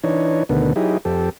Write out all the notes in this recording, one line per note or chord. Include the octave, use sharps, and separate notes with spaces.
E3 D4 D#4 C#5
D2 B2 D3 D#3 B3
F#3 D#4 E4 G4 G#4
F2 G4 A4